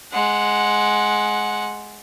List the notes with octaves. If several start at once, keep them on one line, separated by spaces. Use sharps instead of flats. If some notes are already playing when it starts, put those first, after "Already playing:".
G#3 F#5